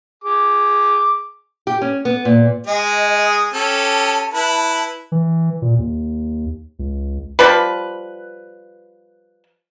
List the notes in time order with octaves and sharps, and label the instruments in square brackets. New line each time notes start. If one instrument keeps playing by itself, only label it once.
[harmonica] G#4 D6
[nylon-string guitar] G4
C#4
B3
A#2
[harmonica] G#3 G#4 [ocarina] D#5
[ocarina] D#6
[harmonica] C#4 G4 A4 [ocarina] A5
[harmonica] E4 B4
[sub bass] E3
A#2
D#2
C#2
[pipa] F3 G3 B4